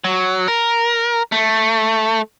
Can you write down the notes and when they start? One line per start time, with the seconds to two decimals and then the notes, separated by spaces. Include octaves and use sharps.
0.04 F#3
0.48 A#4
1.32 A3